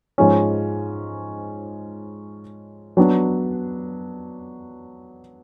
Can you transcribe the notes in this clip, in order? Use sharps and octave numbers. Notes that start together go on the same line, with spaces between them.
G#2 F3 G#3 C#4
F#3 B3 D4